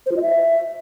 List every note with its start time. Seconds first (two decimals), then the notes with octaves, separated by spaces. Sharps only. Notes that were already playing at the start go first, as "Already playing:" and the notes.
0.06 C5
0.11 F4
0.17 D#5
0.22 E5